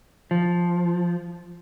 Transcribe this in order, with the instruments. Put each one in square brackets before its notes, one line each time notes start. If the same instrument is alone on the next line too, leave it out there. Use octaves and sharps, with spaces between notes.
[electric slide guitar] F3